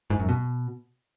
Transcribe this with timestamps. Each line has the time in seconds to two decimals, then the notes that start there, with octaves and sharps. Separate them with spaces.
0.10 G#2
0.20 F#2
0.29 B2